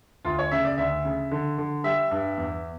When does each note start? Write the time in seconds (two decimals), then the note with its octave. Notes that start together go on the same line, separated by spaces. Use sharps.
0.25 D2 F4
0.39 C#5
0.51 C#3 E5
0.65 D5
0.78 D2 E5
1.05 C#3
1.31 D3
1.58 D3
1.84 G3 E5
2.11 G2
2.37 E2